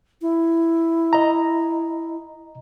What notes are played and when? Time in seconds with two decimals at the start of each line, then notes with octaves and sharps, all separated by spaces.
0.22 E4
1.13 D#5 A#5